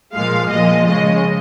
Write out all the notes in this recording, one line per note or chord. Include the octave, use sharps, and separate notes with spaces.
A#2 F3 G#3 F5
A#2 F3 G#3 D#5
C#3 G#3 D#5